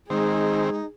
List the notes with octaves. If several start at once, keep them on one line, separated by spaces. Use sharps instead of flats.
D#3 G#3 C4 D#4 G#4